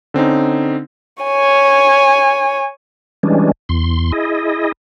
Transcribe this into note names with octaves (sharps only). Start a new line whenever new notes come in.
D3 C4 C#4 D#4
C#5 G#5
E3 G3 G#3 C#4 D4
E2 C6
E4 G#4 D#5